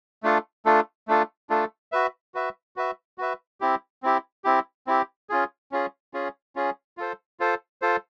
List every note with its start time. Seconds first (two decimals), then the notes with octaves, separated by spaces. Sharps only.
0.23 A3 D4 F4 A4
0.65 A3 D4 F4 A4
1.08 A3 D4 F4 A4
1.50 A3 D4 F4 A4
1.92 F#4 B4 E5
2.34 F#4 B4 E5
2.76 F#4 B4 E5
3.18 F#4 B4 E5
3.61 C4 E4 G4
4.03 C4 E4 G4
4.44 C4 E4 G4
4.87 C4 E4 G4
5.30 C#4 F4 G#4
5.72 C#4 F4 G#4
6.14 C#4 F4 G#4
6.56 C#4 F4 G#4
6.97 F4 A4 C5
7.40 F4 A4 C5
7.82 F4 A4 C5